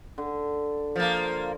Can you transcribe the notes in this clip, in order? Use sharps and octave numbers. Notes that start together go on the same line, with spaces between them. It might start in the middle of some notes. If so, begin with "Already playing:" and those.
D3
F3 A#3